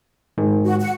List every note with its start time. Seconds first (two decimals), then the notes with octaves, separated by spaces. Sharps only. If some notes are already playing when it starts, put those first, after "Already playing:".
0.38 G#2 D#3 G#3
0.65 F#4
0.80 F#5